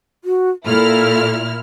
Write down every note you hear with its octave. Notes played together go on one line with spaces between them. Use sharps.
F#4
A#2 E4 A4 F6